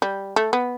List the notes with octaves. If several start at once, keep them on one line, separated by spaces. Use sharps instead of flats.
G3
A3
B3